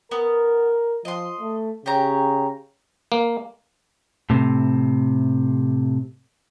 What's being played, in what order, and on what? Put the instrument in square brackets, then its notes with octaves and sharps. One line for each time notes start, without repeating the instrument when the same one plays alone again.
[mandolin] B3 [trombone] A#4
[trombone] F3 [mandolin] D#5 C6
[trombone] A3
[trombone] C#3 [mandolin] G4 C#5 A#5
[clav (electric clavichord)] A#3
[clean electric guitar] A2 C3